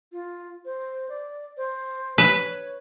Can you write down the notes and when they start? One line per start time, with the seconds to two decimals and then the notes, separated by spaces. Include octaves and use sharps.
0.12 F4
0.65 C5
1.09 D5
1.57 C5
2.18 B4 C#5